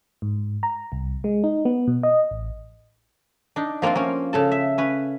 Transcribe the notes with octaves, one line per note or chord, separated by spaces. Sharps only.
G#2
A#5
C2
G#3
D#4
B3
B2
D#5
A1
D4 D#4
F3 A#3 C4 D4 F4
A#3 C#4
C#3 A4 A5
E5
C#4 B4